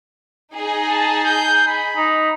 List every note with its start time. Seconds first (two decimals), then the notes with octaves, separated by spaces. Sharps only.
0.56 D#4 G#4
0.90 A5
1.25 G6
1.67 B5
1.97 D#4